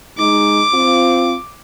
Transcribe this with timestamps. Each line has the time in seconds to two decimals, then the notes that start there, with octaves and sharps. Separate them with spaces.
0.18 G#3 D#4 D6
0.73 C4 F4